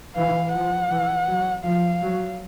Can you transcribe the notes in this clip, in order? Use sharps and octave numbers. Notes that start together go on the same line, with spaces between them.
E3 F5
F3 F#5
E3
F#3
F3 F5
F#3